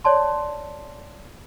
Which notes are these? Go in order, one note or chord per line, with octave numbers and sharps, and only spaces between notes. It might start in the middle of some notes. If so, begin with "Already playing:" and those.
C#5 D5 A5 C6